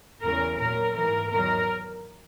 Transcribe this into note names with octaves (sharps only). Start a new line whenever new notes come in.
E2 C#3 E3 A#4
A#2 F#3 A#4
G#2 E3 A#4
E2 D#3 F#3 A#4